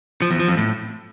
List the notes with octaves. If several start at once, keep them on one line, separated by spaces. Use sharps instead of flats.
F3
E2
F3
F2
A2